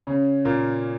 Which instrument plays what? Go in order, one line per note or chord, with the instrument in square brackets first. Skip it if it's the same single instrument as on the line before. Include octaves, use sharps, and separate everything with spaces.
[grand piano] C#3 C#4
A#2 A#3